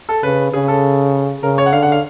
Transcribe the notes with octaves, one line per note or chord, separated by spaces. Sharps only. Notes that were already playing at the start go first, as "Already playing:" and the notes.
A4
C#3 B4
C#3 G#4
A4
C#3 A#4
C#5
F#5
D3 F5
F#5
F5